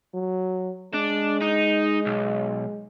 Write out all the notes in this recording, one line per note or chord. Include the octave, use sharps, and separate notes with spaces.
F#3
G#3 D4
D#4
B1